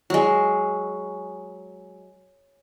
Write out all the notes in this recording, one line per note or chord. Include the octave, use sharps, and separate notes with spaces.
F#3 G#3